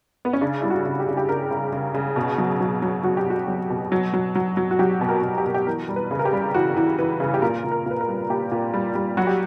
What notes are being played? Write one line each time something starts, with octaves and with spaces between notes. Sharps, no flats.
B3
C#4
C#3 D4
G3 E4
F#4
C#3
G4
C#3
G4
C#3 A#4
C#3
C#3
C#3
B2
F#3
F#3
F#3
F#3 F#4
G4
B2 F#4
F#3
B2
F#3
F#3
F#3
F#3
F#4
F#3 G4
B2
A#4
B2
G4
B2 A#4
G4
E3 A#4
G3
B4
C#3
A#4
G4
G3
E3 F#4
E3
E3 B4
C#3
G4
A#2 A#4
A#2
A#4
A#2 B4
A#4
G3
A#2 G4
A#2
G3
G3
F#3 F#4
G4